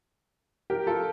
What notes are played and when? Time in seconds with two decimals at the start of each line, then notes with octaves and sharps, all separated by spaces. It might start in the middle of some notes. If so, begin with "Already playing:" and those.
0.70 G4 A#4
0.87 F4 A4